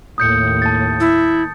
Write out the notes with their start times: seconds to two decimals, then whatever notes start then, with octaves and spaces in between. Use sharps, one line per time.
0.18 D#2 A2 D#6 G6 C#7
0.62 A5 A6
1.00 E4